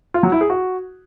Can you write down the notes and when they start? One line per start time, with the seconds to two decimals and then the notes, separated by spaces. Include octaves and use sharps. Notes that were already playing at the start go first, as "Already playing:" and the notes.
0.14 F4
0.23 F#3
0.32 E4
0.41 G#4
0.50 F#4